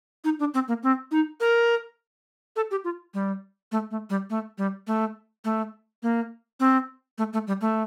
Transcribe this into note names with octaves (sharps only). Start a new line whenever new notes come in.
D#4
D4
C4
A#3
C4
D#4
A#4
A4
G4
F4
G3
A3
A3
G3
A3
G3
A3
A3
A#3
C4
A3
A3
G3
A3